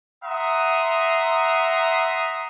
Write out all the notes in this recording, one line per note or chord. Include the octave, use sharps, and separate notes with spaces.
E5 F#5 A#5 C6 D#6